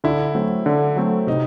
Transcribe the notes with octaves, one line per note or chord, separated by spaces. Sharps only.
D3 E4
F#3 A3 C4
D3
F#3 A3 C4
C3 D#4